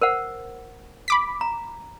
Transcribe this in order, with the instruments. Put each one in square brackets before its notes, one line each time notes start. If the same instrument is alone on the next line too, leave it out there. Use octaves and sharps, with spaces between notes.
[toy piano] A#4 C5 F#5
[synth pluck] B5 D6 B6
[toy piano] A#5